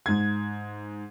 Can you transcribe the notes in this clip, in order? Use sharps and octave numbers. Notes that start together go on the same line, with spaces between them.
G#2 G#6